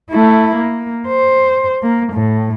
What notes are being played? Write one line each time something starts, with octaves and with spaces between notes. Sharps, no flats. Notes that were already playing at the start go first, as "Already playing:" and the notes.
A3 E4
A#3
C5
A#3
A2